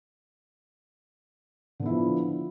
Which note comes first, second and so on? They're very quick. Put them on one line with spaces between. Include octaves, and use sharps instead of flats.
D3 B3 E4 F3